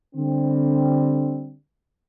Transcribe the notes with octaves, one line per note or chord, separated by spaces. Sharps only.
D3 G3 C4